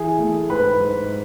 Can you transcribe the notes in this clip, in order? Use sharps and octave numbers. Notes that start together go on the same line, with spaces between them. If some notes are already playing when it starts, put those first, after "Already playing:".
Already playing: E3 G#4 G#5
A3
G#2 B4 B5
G#2